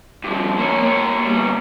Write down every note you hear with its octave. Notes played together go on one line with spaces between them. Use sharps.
G2 F3
A#3 C#5
A#3 C#5
B2 G3